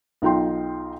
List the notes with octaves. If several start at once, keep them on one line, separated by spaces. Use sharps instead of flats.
B1 D#4 F4 G5 C6